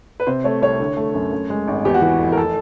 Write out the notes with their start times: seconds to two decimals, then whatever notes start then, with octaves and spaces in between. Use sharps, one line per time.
0.20 B4
0.27 C3 C5
0.44 A3 C#5
0.62 C2 C#5
0.80 D3
0.97 A3
1.14 F#2
1.32 F#2
1.50 G#3
1.68 G#1
1.85 E2 G4
1.94 F#4
2.01 E3 G4
2.19 F1
2.32 A#4
2.38 A4